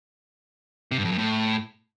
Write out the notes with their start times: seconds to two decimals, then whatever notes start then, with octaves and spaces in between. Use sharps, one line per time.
0.91 C3
0.98 G2
1.05 F2
1.12 F#2
1.18 A2